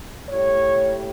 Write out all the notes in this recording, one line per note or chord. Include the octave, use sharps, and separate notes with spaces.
A2 G3 C#5